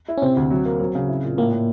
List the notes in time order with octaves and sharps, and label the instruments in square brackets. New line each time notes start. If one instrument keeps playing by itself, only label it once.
[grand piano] E4
[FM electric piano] C#4
[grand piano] C3 [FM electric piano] C4
[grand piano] D2
F#3
A#3
F#3
C#3
E4
A#2
[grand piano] A2 [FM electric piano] A#3
[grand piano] A2